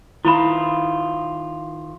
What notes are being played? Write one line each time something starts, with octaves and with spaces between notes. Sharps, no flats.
D#3 E4 F4 B5